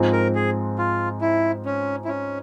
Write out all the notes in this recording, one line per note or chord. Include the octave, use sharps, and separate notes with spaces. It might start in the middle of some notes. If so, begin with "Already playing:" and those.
Already playing: G#2 F3 G#3 C4
A#4
G#4
F4
E4
C#4
E4
C#4